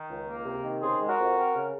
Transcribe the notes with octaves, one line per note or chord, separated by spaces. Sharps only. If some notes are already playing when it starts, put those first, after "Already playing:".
Already playing: D#3
C#2
A#3
C3
D#3
C#3 G#4 C5
G#3
F#4 A#4
F2
C4
C#3